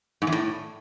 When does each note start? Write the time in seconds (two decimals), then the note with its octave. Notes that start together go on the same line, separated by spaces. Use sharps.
0.22 G#2
0.27 E2
0.32 A2